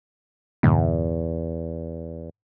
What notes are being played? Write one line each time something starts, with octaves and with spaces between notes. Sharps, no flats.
E2 G2 A#2 D3